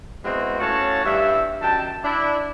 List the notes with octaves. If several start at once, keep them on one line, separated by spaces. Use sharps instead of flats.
G#3 B3 C4 E4 F#4
A2 C#4 F#4 C#5 F5 A5
G2 E5
F#2 D#3 G5 A5
D4 E4